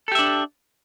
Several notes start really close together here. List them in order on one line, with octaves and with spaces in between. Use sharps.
A4 G4 E5 D4